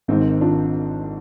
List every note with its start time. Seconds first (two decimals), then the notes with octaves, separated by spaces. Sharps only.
0.08 G#1 G#2 D#3 C4 D#4
0.41 D4 F4